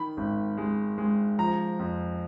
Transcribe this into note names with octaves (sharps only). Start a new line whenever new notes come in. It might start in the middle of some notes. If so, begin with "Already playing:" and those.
Already playing: D#3 B5
G#1
G#3
G#3
F3 A#5
F2